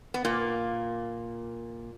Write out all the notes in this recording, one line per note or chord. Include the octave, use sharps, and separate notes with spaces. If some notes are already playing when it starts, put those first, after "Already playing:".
B3
A#2 A#3